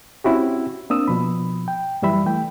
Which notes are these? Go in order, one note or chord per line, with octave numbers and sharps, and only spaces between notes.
C4 C#4 E4 F#4 G4
A#3 C4 D4 D#6 E6
B2 F3 B5
G5
F#2 E3 G3 E5 B5
E3 A3 G5